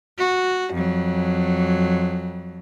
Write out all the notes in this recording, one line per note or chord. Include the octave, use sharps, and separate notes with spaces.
F#4
F2 F#3